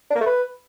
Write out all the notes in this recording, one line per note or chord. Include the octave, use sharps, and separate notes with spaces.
D4
A#3
A3
B4